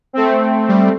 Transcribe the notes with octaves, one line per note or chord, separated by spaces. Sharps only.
A3 C4
G3